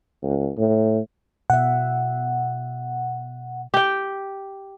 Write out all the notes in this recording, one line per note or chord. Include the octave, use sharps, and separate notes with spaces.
C#2
A2
B2 E5 F#5
G4 G5